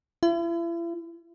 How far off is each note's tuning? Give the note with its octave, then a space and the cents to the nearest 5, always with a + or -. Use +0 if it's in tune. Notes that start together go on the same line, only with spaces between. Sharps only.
E4 +40